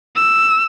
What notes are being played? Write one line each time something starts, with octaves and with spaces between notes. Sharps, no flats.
E6